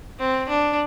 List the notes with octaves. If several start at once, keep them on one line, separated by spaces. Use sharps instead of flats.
C4
D4